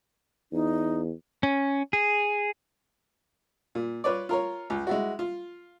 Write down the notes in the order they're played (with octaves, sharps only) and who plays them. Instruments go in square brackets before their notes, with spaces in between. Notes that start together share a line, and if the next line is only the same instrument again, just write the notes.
[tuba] E2 [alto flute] D#4
[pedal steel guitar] C#4
G#4
[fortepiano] A#2
F4 B4 C#5 D5
F4 A#4 C#5
C#2
G#3 E4 F#4
F4